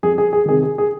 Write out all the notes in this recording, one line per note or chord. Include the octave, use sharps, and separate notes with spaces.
F2 G#4
G#4
G#4
C3 D#3 G#4
G#4
G#4